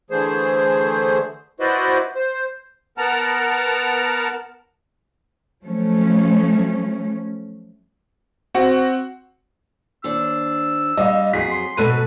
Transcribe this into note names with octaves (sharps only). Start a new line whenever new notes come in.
D3 E3 A3 G#4 C5
E4 F#4 B4 C5 D5 D#5
C5
B3 A#4 F#5 A5 A#5 F6
F3 F#3 A3 C#4
C4 F#4 F#5
D#2 D4 C5 E6
G3 D#5 F5
F2 F#3 G#4 B6 C7
C6
G#2 B2 A4 B4 D#7